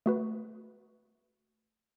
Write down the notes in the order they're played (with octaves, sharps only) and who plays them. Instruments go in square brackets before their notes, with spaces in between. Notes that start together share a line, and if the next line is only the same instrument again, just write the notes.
[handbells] A3 F#4 B4